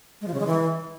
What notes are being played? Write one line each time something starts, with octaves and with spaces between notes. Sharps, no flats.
G#3
F3
C#3
G#3
E3